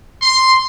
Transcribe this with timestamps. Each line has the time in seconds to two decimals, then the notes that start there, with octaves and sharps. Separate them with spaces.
0.22 C6